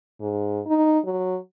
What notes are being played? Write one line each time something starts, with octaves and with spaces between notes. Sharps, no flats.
G#2
D#4
F#3